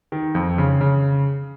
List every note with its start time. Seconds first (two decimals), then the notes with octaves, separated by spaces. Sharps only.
0.12 D#3
0.35 F2
0.58 C#3
0.81 C#3